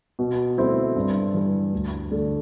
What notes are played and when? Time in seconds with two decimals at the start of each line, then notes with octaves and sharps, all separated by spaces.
0.19 B2
0.58 A3 C4 E4
0.96 G2
1.34 E3 G3
1.73 D2
2.11 D3 A3 D4